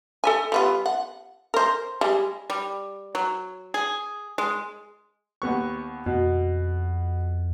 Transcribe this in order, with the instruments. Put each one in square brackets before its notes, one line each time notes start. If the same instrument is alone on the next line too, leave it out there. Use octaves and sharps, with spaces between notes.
[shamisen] A4 E5 G#5
G3 B3 F4
F#5
A#4 C5
G3 G#3
[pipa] G3
F#3
G#4
G#3
[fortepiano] D#2 B3 C#6
[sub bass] F2 [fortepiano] B2